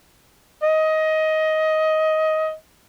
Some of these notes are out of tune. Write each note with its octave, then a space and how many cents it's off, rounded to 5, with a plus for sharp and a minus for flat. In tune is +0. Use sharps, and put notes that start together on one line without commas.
D#5 +15